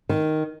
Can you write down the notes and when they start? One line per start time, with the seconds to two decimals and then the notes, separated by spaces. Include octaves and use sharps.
0.09 D#3